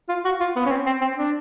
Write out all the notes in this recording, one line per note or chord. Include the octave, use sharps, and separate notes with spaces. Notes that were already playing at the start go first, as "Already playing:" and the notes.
F4
F#4
F4
B3
C#4
C4
C4
C4
D4